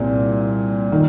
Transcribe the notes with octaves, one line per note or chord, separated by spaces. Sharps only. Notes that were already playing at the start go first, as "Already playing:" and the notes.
Already playing: C2 A#2 C4
D#3